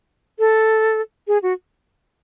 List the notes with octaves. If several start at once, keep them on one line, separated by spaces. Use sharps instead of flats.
A4
G#4
F#4